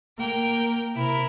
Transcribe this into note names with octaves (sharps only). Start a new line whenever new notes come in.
A#3 A#4 G5
C3 E4 A#4